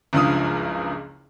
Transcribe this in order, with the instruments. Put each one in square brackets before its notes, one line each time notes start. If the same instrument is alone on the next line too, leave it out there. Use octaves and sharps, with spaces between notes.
[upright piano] F#1 C#2 G2 F3 D#6